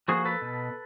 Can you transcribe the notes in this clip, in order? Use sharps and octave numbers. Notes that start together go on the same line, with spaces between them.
F3 A#3 F#4 G#4
A4 B4
B2